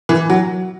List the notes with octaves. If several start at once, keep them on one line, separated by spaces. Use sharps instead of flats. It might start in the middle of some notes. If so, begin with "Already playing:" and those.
E3
F#3